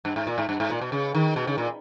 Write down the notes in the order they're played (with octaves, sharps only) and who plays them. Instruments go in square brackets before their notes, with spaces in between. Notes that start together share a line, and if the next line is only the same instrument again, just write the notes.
[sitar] G2
G#2
A#2
G#2
G2
G#2
A#2
B2
C#3
D#3
B2
C#3
A#2